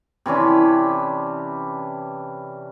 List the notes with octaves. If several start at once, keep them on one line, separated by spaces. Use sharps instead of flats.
C3 E3 C#4 D4